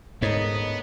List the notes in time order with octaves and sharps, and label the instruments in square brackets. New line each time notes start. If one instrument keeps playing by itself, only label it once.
[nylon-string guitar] D2 A#4 C#5 [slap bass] G#2 [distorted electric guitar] B3 [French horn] D#5